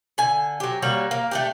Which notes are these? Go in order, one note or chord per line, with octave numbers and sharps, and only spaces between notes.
D3 G#5
F#3 G4
G3 A#3 F#4 C#5
A#3
A3 D4 G4